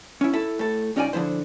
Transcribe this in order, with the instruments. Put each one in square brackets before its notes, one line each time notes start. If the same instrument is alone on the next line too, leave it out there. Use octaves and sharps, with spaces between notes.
[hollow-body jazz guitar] C#4 E4
E4 A4
A2 A4
C2 C#4 D#4 F4 D5 G#5
D3 F3 E4 C5